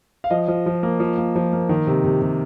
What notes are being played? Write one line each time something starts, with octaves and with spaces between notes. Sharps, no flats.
F5
F3 D#5
F3
F3
A#3
F3
A#3
F3
A#3
D#3
C3
C3
C3